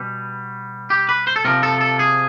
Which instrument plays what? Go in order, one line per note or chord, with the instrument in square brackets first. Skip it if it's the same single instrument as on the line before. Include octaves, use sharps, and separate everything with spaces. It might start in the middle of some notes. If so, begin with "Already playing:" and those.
Already playing: [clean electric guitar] B2 G3
G4
B4
C5
A4
C3 F3 A#4
A4
A4
G#4